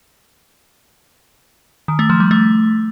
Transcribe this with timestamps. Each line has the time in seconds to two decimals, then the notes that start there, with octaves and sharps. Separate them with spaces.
1.88 D#3
1.99 A3
2.10 F3
2.20 G3
2.31 A3